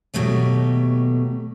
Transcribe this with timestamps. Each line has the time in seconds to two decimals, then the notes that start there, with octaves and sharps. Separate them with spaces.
0.14 D#2 B2 F#3 A3 G4